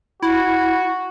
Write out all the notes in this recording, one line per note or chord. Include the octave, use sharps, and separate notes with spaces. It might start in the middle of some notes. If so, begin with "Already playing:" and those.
E4 F#4